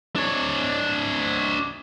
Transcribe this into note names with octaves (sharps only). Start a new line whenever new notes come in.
D4 C#5